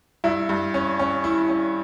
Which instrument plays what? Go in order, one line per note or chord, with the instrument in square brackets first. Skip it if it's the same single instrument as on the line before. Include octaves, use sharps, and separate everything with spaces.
[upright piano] G2 [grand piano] E4
[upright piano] G2
C#4
C#4
E4
C#4